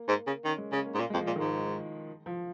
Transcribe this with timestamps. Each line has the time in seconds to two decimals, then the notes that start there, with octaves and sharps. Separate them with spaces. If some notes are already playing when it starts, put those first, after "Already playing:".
Already playing: A#3
0.08 G#2
0.27 C#3
0.45 D#3 C#4
0.58 G#3
0.72 C#3 C#4
0.86 A#3
0.94 G#2
0.99 A#2 A#3
1.10 G#3
1.13 F2
1.17 F3
1.26 A#2
1.36 D#3
1.40 G#2
2.26 F3